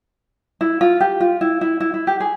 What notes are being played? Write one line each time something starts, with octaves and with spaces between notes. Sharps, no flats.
E4
F4
G4
F4
E4
E4
E4
E4
G4
G#4